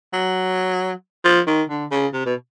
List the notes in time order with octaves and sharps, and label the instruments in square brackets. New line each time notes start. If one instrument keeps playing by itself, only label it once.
[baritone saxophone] F#3
F3
D#3
D3
C#3
C3
B2